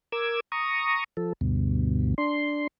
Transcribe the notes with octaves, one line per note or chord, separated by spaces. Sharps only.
A#4 D6 E6 G#6
A#5 C#6 D#6
F3 A4
D2 G2 B2
D4 C6